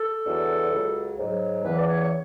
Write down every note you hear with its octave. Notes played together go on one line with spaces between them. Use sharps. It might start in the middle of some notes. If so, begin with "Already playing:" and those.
Already playing: A4
E2 D3 F#3
C#2 C#3 F#3
G#2 F#3
E2 C#3 E3 B4
D5
C#5
C#5